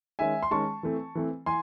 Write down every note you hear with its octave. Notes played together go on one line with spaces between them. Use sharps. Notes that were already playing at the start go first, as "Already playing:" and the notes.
D#3 G#3 C#4 E5 G#5
C6
D#3 G#3 C#4 A5 C#6
E3 A3 C4
E3 A3 C4
E3 G#5 C6